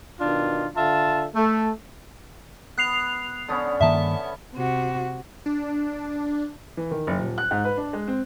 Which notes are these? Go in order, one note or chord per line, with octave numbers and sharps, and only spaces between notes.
B2 D#3 D4 F4
D3 F4 E5 A5
A3
B3 F#6 C7 F7
D3 B3 C#4
G2 D#3 A#3 E5 A5
C3 F#4
D4
E3
D#3
F#1
D#1
F#6
G#2
B4
D4
G#3
C4